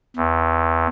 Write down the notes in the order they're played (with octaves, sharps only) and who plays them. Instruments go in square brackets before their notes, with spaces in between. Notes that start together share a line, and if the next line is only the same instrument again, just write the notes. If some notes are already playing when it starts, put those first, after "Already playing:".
[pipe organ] E2